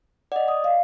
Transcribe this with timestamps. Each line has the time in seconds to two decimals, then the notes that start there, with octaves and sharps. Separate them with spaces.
0.32 D5 D#5 F#5
0.48 D#6
0.64 F5